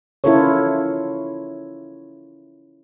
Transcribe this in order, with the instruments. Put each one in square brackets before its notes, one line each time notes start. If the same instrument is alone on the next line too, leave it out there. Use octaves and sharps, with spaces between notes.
[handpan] C#4 E4 F4 A4 A#4 C#5